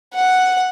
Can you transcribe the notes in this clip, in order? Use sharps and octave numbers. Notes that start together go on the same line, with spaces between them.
F#5